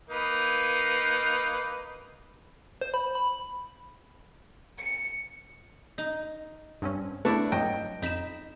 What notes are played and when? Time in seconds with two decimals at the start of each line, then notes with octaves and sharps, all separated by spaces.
0.10 A#3 D#4 B4
2.81 C5
2.94 B5
3.15 B5
4.78 C#7
5.98 D#4
6.82 G2 C4 C#4
7.25 A3 D4 E4 B4
7.52 F2 G#2 F#3 D#5 G5
8.02 F2 D#4 B5 E7